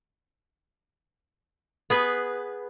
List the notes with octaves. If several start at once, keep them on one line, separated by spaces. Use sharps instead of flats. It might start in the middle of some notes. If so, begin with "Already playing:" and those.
B3 G#4 B4